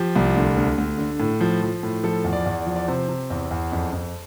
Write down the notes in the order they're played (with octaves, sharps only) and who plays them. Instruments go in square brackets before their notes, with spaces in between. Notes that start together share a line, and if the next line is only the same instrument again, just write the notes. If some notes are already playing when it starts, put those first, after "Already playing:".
Already playing: [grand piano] F3 G4
C2
D2
D2
D2
D3
A2
F3
F3
A2
F3 A4
E2
D5
E2
D5
F3
D5
C3 C5
C3
E2
E2
F2
F2